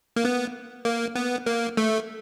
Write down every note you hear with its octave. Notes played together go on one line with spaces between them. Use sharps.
A#3
B3
A#3
B3
A#3
A3